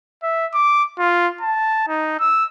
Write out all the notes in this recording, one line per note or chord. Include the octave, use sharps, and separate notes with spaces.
E5
D6
F4
A5
D#4
E6